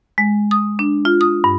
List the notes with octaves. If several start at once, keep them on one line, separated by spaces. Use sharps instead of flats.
G#3
D#6
D4
F4
D#6
G2